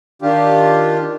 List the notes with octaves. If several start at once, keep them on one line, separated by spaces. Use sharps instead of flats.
D#3 D4 F4 G4